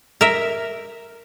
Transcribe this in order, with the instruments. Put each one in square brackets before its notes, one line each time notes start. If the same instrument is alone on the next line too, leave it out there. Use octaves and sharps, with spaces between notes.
[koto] A#4 E5